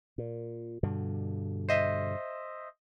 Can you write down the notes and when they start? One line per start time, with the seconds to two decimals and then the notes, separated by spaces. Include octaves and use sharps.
0.18 A#2
0.83 G2 B2 D3
1.69 C5 D#5 E5